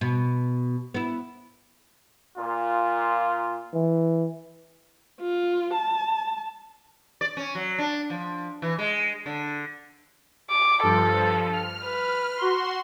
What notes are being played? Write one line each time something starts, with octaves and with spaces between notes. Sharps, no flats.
B2
B3 E4
A#2 F4
E3
F4
A5
D5
C#4
F#3
D4
F3
E3
G#3
D3
D6
G2 F3 A4
F6
B4
F#4 C6